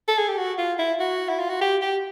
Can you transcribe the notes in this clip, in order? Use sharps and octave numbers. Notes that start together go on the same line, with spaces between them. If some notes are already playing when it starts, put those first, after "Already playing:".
A4
G#4
G4
F#4
F4
E4
F#4
E4
F4
F#4
G4
G4